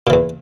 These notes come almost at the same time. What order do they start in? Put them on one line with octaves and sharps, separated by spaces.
A#2 E3 E2